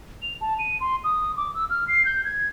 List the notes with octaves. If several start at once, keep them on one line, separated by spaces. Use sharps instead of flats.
F7
A5
D#7
C6
D#6
D6
E6
F6
C7
G6
G#6